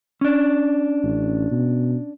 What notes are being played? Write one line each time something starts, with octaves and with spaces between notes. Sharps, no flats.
C#4 D4
A1
B2